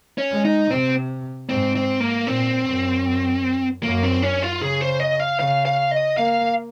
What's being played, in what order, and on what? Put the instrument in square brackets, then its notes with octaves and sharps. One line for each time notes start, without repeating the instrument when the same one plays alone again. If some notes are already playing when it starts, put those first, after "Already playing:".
[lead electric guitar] C#4
[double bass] G#3
[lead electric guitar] D#4
[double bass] C3 [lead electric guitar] C4
[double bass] G#2 [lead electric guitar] C4
[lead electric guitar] C4
A#3
[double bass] A#2 [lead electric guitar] C4
[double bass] F#2
[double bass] F#2 [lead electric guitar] A#3
[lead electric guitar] C4
C#4
F4
[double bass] C#3 [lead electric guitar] G#4
[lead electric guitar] C5
D#5
F5
[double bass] C#3 [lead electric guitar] F5
[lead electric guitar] F5
D#5
[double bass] A#3 [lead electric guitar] F5